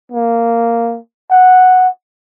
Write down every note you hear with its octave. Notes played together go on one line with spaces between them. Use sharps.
A#3
F#5